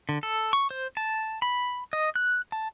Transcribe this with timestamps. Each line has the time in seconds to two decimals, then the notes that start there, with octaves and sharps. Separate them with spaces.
0.09 D3
0.23 A4
0.53 C#6
0.71 C5
0.97 A5
1.42 B5
1.93 D#5
2.16 F#6
2.52 A5